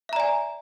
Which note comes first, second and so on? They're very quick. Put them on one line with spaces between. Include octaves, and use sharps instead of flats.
E5 A#5 D5 G#5